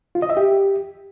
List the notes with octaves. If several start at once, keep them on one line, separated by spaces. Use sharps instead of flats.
F4
D#5
E5
G4